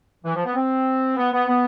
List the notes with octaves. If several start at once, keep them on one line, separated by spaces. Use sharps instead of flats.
E3
F3
B3
C4
B3
B3
B3